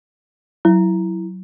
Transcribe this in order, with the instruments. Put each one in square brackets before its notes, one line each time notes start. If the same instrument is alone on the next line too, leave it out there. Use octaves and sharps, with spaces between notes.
[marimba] F#3 [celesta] E4